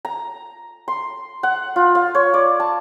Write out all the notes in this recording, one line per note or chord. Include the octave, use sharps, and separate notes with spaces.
A#5
C6
F#5
F4
F5
C#5
D5
A5